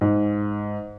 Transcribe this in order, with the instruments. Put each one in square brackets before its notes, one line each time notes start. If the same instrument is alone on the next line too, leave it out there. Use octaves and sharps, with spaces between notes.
[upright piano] G#2